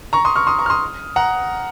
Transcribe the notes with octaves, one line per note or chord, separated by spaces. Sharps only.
A#5 C#6
C6 D#6
C#6 F6
C6 D#6
A#5 C#6
F6
C6 D#6
F#5 A#5